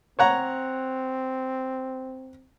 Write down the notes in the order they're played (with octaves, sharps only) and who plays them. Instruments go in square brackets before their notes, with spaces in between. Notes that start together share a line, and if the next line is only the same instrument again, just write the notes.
[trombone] C4 [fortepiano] C#5 F#5 A#5